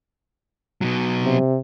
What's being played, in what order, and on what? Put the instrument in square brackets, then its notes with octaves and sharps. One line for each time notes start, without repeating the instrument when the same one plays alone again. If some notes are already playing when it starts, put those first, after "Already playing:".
[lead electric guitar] B2 F#3
[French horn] C3